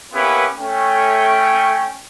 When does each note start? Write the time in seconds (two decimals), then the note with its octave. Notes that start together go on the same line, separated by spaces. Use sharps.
0.14 A#3 B3 C#4 E4 G4 B4
0.58 A3 C#4 G5